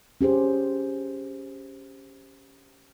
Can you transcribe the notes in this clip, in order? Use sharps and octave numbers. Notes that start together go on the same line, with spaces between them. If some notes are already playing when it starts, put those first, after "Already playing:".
C#4 G4 G#4 C5